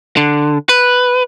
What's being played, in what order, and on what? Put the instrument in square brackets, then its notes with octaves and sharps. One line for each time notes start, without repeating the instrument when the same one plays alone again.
[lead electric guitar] D3
B4